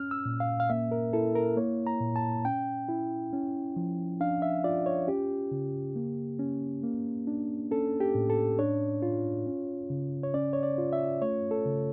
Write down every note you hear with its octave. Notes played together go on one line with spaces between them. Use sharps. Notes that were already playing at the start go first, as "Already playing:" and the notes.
Already playing: C#4 F6
E6
A#2
F5
F5
A#3 E5
A#4
E4 A4
A#4
A#3 C#5
A#5
A#2
A5
C#4 G5
E4
C#4
F3
D4 F5
E5
F4 D5
C#5
C#4 G4
C#3
A#3
C#4
A#3
D4
C#4 A4
G4
A2
A4
D4 C#5
F4
C#4
C#3
C#5
C#4 D5
C#5
D5
F4
E5
A3 C#5
A4
C#3